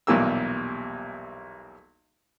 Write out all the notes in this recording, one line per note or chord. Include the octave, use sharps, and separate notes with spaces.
B1 E2 A#2 G3 A#3 E6